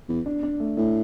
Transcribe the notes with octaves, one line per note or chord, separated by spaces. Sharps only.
E2
D4
D4
A3
A2 A3